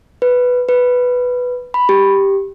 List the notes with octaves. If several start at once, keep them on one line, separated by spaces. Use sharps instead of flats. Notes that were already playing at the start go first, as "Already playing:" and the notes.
B4
B4
B5
G4